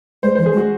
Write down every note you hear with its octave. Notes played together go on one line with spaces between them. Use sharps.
G#3 C5
E3 C5
G#4
G#3
F#4